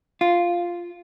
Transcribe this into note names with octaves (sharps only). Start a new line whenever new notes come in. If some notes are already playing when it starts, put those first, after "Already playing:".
F4